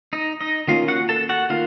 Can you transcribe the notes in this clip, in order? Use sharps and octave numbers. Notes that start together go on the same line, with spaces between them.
D#4 D#5
D#4 D#5
D#3 A#3 C#4 F4 F5
F#4 F#5
A4 A5
F#4 F#5
D#3 A#3 F4 F5